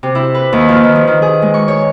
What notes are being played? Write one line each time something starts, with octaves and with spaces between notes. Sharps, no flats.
C3
E4
B4
D#2
F3
D#3
F3
D#3
G#4
G#3
C#6
C#5